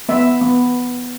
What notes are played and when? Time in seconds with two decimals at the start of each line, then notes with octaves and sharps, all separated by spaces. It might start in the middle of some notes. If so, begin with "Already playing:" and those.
0.09 B3 E5
0.42 B3